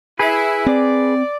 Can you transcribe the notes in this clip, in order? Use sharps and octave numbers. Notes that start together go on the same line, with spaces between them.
E4 G#4 B4
C4 D5